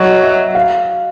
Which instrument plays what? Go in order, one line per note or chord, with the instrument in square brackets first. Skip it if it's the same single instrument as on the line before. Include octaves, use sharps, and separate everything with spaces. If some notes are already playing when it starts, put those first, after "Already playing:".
Already playing: [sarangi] F#3 [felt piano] D#5
[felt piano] E5
F5